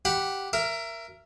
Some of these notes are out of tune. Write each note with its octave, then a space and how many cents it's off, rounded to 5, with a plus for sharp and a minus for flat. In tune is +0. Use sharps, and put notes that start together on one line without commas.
G4 -5 F#5 +0 B5 +0
A#4 +0 E5 +25